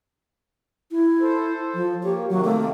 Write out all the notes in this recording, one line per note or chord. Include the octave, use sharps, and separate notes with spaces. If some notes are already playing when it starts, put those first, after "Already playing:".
E4
A4 C5
F3
A#3 G4 C#5
C3 D#3 F#3 A#3
A3